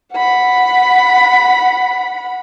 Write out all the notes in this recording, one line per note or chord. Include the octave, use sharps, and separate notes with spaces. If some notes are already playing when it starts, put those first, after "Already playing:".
F#5 B5